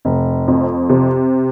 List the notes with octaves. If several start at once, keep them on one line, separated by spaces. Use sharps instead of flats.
F1
F2
C3